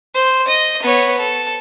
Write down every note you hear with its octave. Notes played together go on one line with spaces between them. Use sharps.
C5
D#5
B3 C#5
A4